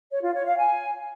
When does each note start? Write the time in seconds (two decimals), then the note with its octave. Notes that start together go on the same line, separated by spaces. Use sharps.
0.12 C#5
0.23 F4
0.35 C#5
0.46 F5
0.57 G#5